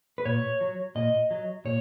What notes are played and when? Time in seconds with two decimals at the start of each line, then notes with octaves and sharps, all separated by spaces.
0.18 B4
0.25 A#2 C#5
0.61 F#3
0.95 A#2 D#5
1.31 F#3
1.65 A#2 C#5